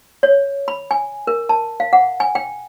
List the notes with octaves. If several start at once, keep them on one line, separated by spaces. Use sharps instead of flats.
C#5
B5
G#5
A#4
A5
F5
F#5
G#5
G5